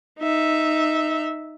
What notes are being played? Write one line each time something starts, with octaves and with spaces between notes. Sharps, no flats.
D#4 E5